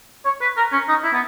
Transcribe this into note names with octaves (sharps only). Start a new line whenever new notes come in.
C#5
B4
A#4
C#4
D#4
E4
B3